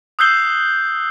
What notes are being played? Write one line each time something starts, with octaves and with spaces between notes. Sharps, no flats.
D#6 E6 F#6 G6 C7 G7